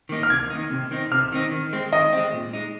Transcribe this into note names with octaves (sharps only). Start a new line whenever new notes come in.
D#3 A#3 D#4
F6
C3 G#6
D#3 A#3 D#4
C3
D#3 C4 D#4
C3 F6
D#3 C4 D#4
D#3
G#3 C4
D#3 D#5
G#3 C4
A#2
G#3 D#4